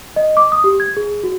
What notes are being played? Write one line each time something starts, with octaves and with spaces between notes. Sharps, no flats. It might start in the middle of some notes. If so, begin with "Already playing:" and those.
D#5
D6
D#6
G4
G#6
G#4
F#4